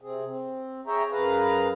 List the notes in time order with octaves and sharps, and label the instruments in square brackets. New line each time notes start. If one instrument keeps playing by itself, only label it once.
[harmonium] C3 C4 G#4
C4
G#4 C#5 E5 G5 A#5
F#2 G#4 B4 F5 A#5